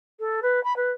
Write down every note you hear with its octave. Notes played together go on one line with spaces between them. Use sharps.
A4
B4
B5
B4